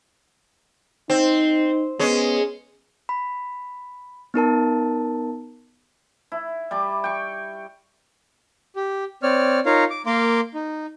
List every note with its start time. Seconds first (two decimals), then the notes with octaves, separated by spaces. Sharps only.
1.10 C4 D#4
1.99 G#3 B3 C#4
3.09 B5
4.34 B3 D#4 A#4 A5
6.32 E4
6.71 G3 D5 D6
7.04 G5 C#6
8.76 G4
9.23 C4 C#5 D5 F6
9.66 D#4 F4 A#4 C#5 F5 A#5
9.90 D6
10.06 A#3 A#4 F5 C6 D6
10.54 D#4